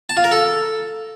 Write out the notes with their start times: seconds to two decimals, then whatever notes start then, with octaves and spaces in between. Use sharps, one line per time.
0.09 A5
0.17 F4
0.24 A#4
0.31 A4